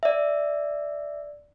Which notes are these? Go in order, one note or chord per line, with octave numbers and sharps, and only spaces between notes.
D5 E5